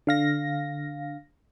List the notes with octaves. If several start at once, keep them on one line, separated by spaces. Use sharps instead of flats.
D3 F5 A#6